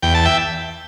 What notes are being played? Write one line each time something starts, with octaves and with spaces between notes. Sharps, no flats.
E2 G5
A5
E5 G5